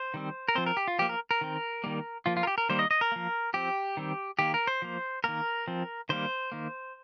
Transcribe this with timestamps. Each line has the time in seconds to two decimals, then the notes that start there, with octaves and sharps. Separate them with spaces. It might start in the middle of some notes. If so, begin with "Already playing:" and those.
Already playing: C5
0.14 D#3 G3 C4
0.49 A#4
0.55 F3 C4 C5
0.66 A#4
0.77 G4
0.88 F4
0.99 F3 A#3 G4
1.09 A#4
1.31 A#4
1.41 D#3 C4
1.84 D#3 G3 A#3
2.26 F3 A#3 F4
2.37 F4
2.43 A#4
2.47 G4
2.58 A#4
2.69 D#3 G3 A#3 C5
2.79 D#5
2.91 D#5
3.01 A#4
3.12 F3 A#3
3.54 F3 C4 G4
3.97 D#3 G3 C4
4.39 D#3 A#3 G4
4.54 A#4
4.67 C5
4.82 F3 A#3
5.24 D#3 A#3 A#4
5.68 F3 C4
6.09 D#3 G3 A#3 C5
6.52 D#3 A#3